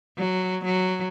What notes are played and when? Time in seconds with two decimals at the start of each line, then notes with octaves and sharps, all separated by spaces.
0.18 F#3
0.65 F#3